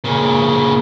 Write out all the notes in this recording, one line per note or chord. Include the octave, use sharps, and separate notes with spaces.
A#2 C#3